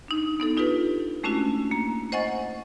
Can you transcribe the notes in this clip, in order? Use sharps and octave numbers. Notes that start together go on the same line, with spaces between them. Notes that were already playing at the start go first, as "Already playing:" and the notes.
D4 D#4
B3 D#4 A4
D4 F4 G4 A4 B4
G#3 A3 C#4 D4 E4 F#4
A#3 A#5
C5 D#5 F#5 G#5 C#6 A6